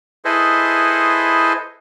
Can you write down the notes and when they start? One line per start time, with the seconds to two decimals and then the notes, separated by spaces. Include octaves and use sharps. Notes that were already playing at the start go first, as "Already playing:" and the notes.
0.25 E4 G#4 A4 B4 C5 D#5